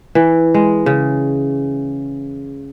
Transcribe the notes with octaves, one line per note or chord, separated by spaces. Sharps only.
E3
G#3
C#3